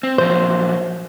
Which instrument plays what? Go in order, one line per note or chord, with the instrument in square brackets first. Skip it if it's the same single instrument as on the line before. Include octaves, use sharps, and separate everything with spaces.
[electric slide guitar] C4
[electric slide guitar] A#2 F3 F#3 [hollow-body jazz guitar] C5